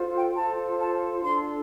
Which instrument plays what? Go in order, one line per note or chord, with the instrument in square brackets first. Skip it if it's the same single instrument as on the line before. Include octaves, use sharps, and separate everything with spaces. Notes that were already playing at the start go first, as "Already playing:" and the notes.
Already playing: [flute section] F4 A4 C5
G5
F4 A4 C5 A5
A5
D4 F4 A4 C6